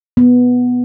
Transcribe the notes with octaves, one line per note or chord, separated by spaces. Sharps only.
B3